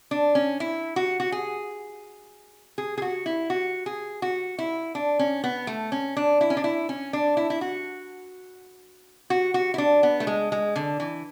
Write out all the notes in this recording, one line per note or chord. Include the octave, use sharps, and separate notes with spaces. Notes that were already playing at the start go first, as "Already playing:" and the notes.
D4
C#4
E4
F#4
F#4
G#4
G#4
G#4
F#4
E4
F#4
G#4
F#4
E4
D4
C#4
B3
A3
C#4
D4
E4
C#4
D4
E4
C#4
D4
E4
E4
F#4
F#4
F#4
E4
D4
B3
A3
G#3
G#3
D3
E3